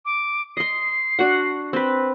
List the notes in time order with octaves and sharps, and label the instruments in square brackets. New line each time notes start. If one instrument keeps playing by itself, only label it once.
[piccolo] D6
[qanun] D#5 C6 [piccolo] C7
[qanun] D4 F#4 F#5
C4 B4